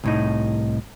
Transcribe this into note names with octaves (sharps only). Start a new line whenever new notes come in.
C2 A2 D#4